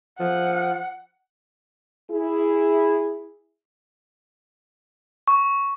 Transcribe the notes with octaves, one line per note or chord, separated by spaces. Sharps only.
F3 F#5
E4 G#4
C#6